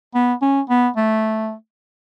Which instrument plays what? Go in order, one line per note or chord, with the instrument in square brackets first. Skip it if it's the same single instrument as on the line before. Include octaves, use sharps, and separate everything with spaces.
[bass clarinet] B3
C#4
B3
A3